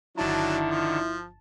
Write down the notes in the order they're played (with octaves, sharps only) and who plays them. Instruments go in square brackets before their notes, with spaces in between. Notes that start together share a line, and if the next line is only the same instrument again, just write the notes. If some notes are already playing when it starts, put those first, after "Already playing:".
[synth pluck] G1 A5 [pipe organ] D3 D#3 [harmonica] F#3 D4 [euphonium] E4
[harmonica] F3